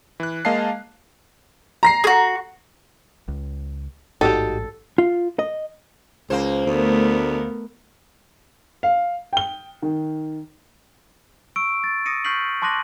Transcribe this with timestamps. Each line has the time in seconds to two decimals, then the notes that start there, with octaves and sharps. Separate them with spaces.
0.20 E3 F#6
0.45 G#3 A#3 D#5 F5 A5 C7
1.83 A#5 A#6 C7
2.04 F#4 G#4
3.28 C#2
4.21 A1 G#2 G3 D#4 F#4 G4 A4
4.98 F4
5.39 D#5
6.30 C#2 A#3 C5
6.66 D2 A3 B3 A#4
8.83 F5
9.33 G5 G7
9.82 D#3
11.56 C#6 E6 D7
11.84 A6
12.06 D#6 A#6 C#7 D#7
12.25 C#6 F6 G6 B6 C7 F#7
12.62 A5 C6 D6 F#6 A#6 F#7